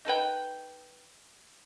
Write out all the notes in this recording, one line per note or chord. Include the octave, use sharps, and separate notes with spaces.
D#4 A4 B4 G5